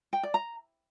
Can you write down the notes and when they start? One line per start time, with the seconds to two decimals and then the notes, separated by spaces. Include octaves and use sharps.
0.13 G5
0.23 D5
0.34 A#5